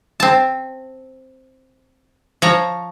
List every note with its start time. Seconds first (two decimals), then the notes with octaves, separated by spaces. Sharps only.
0.20 C4 A5
2.42 F3 C#5 A#5